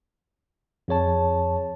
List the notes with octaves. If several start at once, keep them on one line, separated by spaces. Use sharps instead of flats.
F2 G#4 C#5 A5